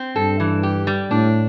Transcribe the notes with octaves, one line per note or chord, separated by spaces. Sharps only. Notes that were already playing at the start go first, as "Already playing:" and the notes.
Already playing: C4
G2 A4
E3
G4
G3
A2 D4